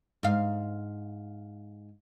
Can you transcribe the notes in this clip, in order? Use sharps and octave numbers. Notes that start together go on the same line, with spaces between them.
G#2 F5